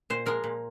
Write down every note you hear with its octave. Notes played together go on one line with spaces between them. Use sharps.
A#2 C5
F3 G#3 A#4
A#2